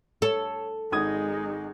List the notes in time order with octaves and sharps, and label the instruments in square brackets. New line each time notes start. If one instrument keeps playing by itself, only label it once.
[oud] A4 [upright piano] C#5
[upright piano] G#1 D#6 G#6 [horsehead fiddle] G#3 D#4